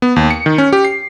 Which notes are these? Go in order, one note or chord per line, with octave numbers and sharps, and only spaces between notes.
B3
D#2
C#7
D#3
C#4
G4
C7